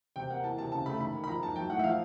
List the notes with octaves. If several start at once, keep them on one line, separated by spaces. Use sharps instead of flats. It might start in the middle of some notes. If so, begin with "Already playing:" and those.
C3 G5
A#3 F#5
E3 A5
C3 A5
C#3 A5
A3 B5
D#3 B5
A#3
B5
F3 A#5
G#2 A5
F#3 G5
A2 F#5
E5
F3 F5